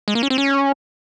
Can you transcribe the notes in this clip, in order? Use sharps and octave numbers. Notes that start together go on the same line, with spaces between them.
G#3
A#3
C#4
C4
C#4